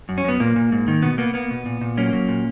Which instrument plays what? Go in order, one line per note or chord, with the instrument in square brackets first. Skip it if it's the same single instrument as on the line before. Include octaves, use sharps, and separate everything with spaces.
[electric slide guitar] F#2
C#4
F#2 B3
A#2 A#3
A#2
G#2
D#3
B2 B3
A#3 B3
A#3 B3
B2
A#2
A#2
F#3 A#3 C#4
F#3
A#2